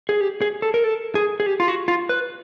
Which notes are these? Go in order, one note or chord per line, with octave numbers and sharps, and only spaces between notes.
G#4
G4
G#4
A4
A#4
A4
G#4
G#4
G4
F4
F#4
F4
B4